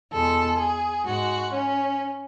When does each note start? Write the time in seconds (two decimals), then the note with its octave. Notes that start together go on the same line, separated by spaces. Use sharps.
0.12 E2 B2 G#3 A4
0.58 G#4
1.04 G#2 G#3 F#4
1.51 C#4